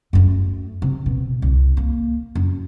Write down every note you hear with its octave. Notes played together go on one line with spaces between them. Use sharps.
F#2 A3
C3
B2
C2
A#3
F#2